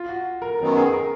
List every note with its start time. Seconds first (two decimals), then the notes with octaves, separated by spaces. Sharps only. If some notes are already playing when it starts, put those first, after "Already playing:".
Already playing: F4
0.08 F#4
0.42 A#4
0.59 F#2 D#3 F#3 B3 A#4
0.77 G#4
0.93 A#4